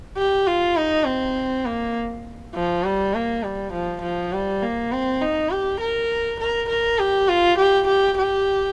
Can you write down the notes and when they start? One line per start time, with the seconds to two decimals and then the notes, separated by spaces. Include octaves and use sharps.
0.18 G4
0.47 F4
0.76 D#4
1.06 C4
1.65 A#3
2.55 F3
2.84 G3
3.14 A#3
3.43 G3
3.73 F3
4.02 F3
4.32 G3
4.62 A#3
4.92 C4
5.22 D#4
5.51 G4
5.80 A#4
6.40 A#4
6.69 A#4
6.99 G4
7.28 F4
7.58 G4
7.88 G4
8.18 G4